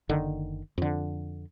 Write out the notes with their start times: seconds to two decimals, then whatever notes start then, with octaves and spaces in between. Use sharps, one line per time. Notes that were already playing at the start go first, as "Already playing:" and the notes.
0.09 F#1 D3 D#3
0.78 F2 D3